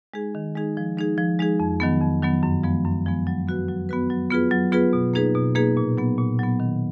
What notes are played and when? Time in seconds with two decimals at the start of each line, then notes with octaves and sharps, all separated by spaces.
0.14 G#3 D#4 G#4
0.35 D#3
0.55 G#3 D#4 G#4
0.77 F3
0.97 G#3 D#4 G#4
1.18 F3
1.39 G#3 D#4 G#4
1.60 F2
1.80 D#3 F#3 B3
2.01 F2
2.22 D#3 F#3 B3
2.43 F#2
2.64 F3 G#3 B3
2.85 F#2
3.06 F3 G#3 B3
3.27 F#3
3.47 B3 F#4 B4
3.68 F#3
3.89 B3 F#4 B4
4.10 F#3
4.30 B3 F4 G#4 B4
4.51 F#3
4.72 B3 F4 G#4 B4
4.93 B2
5.14 A#3 D#4 G#4 B4
5.35 B2
5.55 A#3 D#4 G#4 B4
5.77 A#2
5.98 F#3 B3
6.18 A#2
6.39 F#3 B3
6.60 D#3